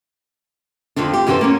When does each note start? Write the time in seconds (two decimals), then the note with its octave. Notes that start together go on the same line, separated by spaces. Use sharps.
0.96 F2 D3 F3 C4 D4
1.13 G4
1.27 F#2 D3 E3 F#4 B4 C5
1.41 A#3 B3 C#4